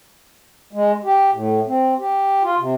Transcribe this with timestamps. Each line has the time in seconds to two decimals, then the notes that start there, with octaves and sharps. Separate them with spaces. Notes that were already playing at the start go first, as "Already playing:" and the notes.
0.73 G#3
1.04 G4
1.32 A2
1.66 C4
1.99 G4
2.43 F4
2.59 C3